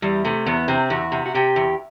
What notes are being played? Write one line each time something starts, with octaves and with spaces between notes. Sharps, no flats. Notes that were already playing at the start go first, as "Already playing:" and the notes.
E2 G3
C3 A3
E2 B3
C3 C4
E2 F#4
C3
F#4
C3 G4
E2